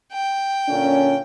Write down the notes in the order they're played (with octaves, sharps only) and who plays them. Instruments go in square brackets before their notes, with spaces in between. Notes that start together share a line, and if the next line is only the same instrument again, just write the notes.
[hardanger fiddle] G5
[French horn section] A#2 D3 C#4